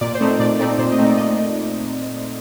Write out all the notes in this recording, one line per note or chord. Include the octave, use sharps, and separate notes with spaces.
A#2 D5
C5
A3 C4 D#4
A#2 D5
A3 C4 D#4 D5
A#2 C5
D#5
A3 C4 D#4
D5
A#2 D#5